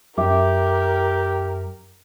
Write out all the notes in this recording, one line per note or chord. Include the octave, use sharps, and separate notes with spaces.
F#2 G4 A#4 E5 D6